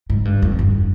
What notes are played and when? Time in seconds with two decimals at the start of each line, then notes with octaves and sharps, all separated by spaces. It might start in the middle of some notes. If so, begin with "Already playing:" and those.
0.10 G#2
0.25 G2
0.42 F2
0.59 G2